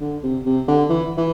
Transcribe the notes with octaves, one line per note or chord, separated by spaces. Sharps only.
D3
C3
C3
D3
E3
E3